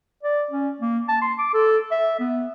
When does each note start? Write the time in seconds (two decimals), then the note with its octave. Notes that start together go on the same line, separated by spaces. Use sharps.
0.23 D5
0.51 C#4
0.81 A#3
1.08 A5
1.22 C6
1.39 D6
1.54 A4
1.91 E5
2.20 B3